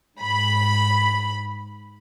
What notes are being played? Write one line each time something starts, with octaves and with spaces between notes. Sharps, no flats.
G#2 B5